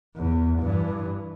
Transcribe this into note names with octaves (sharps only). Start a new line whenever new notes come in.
E2
G2 E3